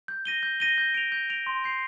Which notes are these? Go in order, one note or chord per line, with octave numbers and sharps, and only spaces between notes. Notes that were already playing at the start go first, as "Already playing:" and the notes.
G6
A#6 D#7 G7
G6
A#6 D#7 G7
G6
D7 F7
G6
D7 F7
C6
G6 C7 F7